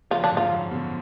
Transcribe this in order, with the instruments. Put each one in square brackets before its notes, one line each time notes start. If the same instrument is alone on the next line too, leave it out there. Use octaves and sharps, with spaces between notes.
[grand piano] C#3 F3 [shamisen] F4
[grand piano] D3 F#3 [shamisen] D4
[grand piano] F2 G#2
[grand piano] F#2 [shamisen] F4
[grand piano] C#3 F3
B2 D3